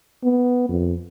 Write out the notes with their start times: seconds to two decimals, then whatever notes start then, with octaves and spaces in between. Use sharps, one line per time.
0.24 B3
0.69 F2